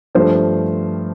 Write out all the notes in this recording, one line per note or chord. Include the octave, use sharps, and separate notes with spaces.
G2 F3 A3 C5